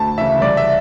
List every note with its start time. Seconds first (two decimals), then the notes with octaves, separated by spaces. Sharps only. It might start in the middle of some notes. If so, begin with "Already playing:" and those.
Already playing: D2 A5
0.18 C#3 E3 E5
0.41 C2 D5
0.57 E5